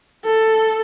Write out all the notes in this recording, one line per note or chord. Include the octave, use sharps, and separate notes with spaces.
A4